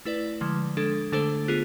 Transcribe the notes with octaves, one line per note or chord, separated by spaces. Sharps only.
A3 E4 B4 D5
D3 F3 G#3
G#3 D4 A4
D3 A3 D4 A4 C5
B3 F4 G#4